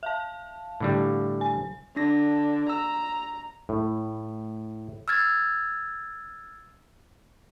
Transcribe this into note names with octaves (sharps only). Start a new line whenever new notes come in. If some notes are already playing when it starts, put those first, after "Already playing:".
E5 F5 A5
A2 D3 G3
G#5
D3 D4 A#6
A#5 E6
A2
E6 F6 G#6 A6